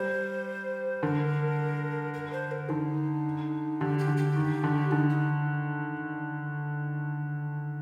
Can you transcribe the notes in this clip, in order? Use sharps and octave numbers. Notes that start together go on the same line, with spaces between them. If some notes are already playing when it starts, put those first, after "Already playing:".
Already playing: G3 C5
D3 A#4
A#4
C5
A#4
D3 D#4
D3 G4
G4
D3
G4
D#3
D3
D3 D#4
D#4